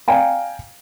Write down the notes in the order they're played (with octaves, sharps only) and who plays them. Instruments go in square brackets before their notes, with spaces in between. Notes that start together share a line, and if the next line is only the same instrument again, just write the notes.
[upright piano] D5 F5 G5 G#5 A#5